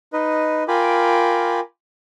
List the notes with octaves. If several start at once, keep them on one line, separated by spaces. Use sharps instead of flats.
D#4 B4 D#5
F4 A#4 G5 G#5 B5 D6